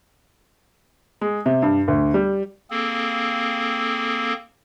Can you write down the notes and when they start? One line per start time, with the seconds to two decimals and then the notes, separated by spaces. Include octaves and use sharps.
1.21 G#3
1.46 C3
1.62 G2
1.88 D2
2.14 G3
2.70 A#3 C4 G#4 A4